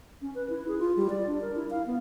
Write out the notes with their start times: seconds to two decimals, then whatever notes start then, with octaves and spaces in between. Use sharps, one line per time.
0.22 C#4
0.35 B4
0.50 E4
0.68 G#4
0.79 F4
0.97 G3
1.10 D5
1.27 D4
1.42 A#4
1.56 E4
1.70 F5
1.86 B3